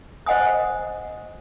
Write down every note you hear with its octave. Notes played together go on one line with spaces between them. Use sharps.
C5 D#5 F#5 G#5 D#6